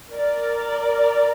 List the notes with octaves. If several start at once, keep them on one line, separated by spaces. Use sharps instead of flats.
A#4 D5